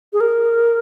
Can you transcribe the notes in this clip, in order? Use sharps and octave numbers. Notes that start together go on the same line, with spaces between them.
G#4
A#4